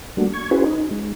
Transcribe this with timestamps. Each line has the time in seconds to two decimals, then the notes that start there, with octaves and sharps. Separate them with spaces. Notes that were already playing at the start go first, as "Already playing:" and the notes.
0.17 G3 A3 A#3 D4 F#4
0.33 C#6 G#6
0.51 C#4 E4 F#4 G#4 B4 C5
0.65 D#4
0.91 G#3